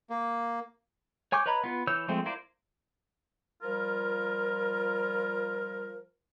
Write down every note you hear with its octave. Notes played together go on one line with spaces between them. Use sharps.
A#3
C#5 G#5 C#6 D6 G6
B4 C#5 D#5 A#5 B5
B3 F4
E3 C#5 E6 G6
F3 G#3 A3 C4
E4 F4 A#4 C5 D5
F3 G3 F4 A#4